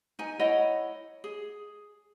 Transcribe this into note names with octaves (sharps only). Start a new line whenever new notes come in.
D#4 G#5
E4 C#5 D#5 F#5
G#4